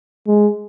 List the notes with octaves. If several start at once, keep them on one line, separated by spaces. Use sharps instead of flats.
G#3